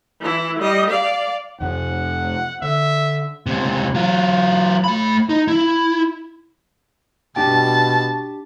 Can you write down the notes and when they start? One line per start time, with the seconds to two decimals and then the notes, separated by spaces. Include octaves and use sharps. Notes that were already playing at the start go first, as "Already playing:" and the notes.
0.20 E3 E4
0.59 G3 D#5
0.90 D5 F5
1.61 F2 C3 F#5
2.62 D3 E5
3.46 C#2 C3
3.95 F#3 F4
4.84 A3 B5
5.29 D#4
5.48 E4
7.36 B2 D4 G4 G5 A5